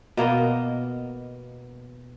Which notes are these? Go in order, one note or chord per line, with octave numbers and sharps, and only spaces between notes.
B2 A#3 B3 D#5